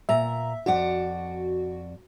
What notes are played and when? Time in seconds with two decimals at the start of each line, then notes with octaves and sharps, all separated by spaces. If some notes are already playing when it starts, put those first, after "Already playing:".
0.09 A#2 E5 A#5
0.66 F2 F#4 D5 F#5